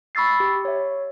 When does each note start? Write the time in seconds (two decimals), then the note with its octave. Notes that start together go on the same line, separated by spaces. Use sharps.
0.15 B5 C#6 E6 A6 C7
0.40 G4
0.65 C#5 E5